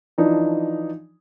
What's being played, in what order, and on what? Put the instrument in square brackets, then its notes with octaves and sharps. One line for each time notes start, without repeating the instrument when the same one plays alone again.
[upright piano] E3 F3 D4 D#4